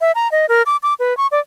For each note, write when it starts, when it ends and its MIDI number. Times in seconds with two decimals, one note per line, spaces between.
0.01 0.12 76
0.15 0.30 82
0.32 0.46 75
0.49 0.62 70
0.66 0.77 86
0.83 0.94 86
0.99 1.16 71
1.17 1.27 85
1.32 1.40 74